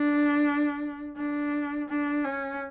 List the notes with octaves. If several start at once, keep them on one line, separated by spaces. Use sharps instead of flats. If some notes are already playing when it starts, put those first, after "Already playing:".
Already playing: D4
D4
D4
C#4